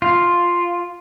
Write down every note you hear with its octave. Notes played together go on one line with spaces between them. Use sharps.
F4